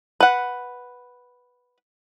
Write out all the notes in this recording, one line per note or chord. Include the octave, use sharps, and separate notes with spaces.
B4 F#5